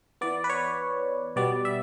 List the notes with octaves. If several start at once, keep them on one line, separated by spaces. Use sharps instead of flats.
E3 B3 D5
B4
C#5
B2 G3 B3 D5
E5